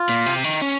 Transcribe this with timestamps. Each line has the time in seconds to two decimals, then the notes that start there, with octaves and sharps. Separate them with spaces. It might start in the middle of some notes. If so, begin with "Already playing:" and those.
Already playing: F4
0.09 A#2
0.26 C3
0.44 D#3
0.62 C#4